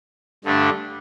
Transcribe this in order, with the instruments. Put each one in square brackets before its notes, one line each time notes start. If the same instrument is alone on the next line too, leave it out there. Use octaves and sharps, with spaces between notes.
[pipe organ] G2 D3 A3 D4